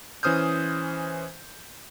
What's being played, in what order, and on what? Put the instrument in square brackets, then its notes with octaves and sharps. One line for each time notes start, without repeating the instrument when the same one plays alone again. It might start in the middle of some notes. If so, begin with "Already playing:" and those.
[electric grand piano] E3 C#4 C5 D#6 F6 G6